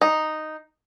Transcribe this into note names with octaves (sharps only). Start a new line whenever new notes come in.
D#4